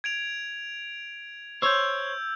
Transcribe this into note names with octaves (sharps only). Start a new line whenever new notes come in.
G#6 D7 F7
C5 C#5 E6 G6